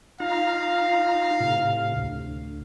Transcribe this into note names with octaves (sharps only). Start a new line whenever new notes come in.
D#4 F4 F5 A#5
A2 C3
D2